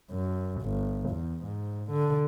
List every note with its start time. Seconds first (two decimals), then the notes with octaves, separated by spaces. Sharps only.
0.11 F#2
0.62 G1
1.09 E2
1.44 G#2
1.91 D3